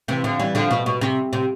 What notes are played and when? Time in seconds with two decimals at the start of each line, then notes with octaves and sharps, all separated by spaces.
0.08 C3 E3
0.24 D3 F3
0.39 E3 G3
0.55 D3 F3
0.71 B2
0.86 B2
1.01 C3
1.33 C3